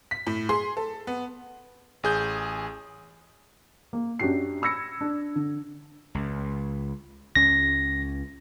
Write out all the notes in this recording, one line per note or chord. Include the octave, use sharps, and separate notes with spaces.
B6
A2
G#4 C6
A4
B3
A1 G#4 G6
A#3
F#2 D4 F#4 G4 C7
B5 E6 G#6 A#6 C#7
D4
D3
C#2
C#2 C#4 A#6